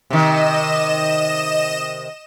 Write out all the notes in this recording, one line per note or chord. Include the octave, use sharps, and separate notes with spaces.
C3 D#3 D#5 E7